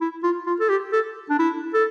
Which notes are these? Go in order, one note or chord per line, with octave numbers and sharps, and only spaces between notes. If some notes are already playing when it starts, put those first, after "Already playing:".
E4
F4
F4
A4
G4
A4
D4
E4
A4